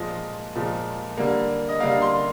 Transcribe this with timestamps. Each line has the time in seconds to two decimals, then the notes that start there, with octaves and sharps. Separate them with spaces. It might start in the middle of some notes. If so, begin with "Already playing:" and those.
Already playing: A#2 F3 G#3 D#5
0.55 A#2 F3 G#3
1.17 D3 G3 A#3
1.69 D#5
1.80 D3 G3 A#3 F5
2.02 C6